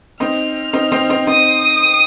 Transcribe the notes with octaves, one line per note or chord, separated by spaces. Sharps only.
C4 D#4 F6
C4 D#4
C4 D#4
C4 D#4
C4 D#4 D#6